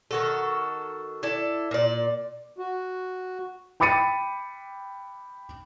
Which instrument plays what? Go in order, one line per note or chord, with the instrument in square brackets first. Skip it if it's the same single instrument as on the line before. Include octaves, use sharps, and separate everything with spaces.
[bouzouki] D#3 F#4 A4
E4 A4 D5
A#2 D5
[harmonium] F#4
[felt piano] G5 B5 D6 A6 C#7 D#7